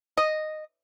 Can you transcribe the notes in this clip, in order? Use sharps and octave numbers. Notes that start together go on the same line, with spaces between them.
D#5